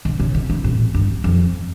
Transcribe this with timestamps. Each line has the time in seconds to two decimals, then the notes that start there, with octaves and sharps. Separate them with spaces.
0.05 D3
0.20 C#3
0.34 D3
0.50 E3
0.64 A2
0.94 G2
1.24 F2